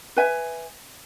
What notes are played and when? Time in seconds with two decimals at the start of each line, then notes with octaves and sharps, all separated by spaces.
0.17 B4 E5 G#5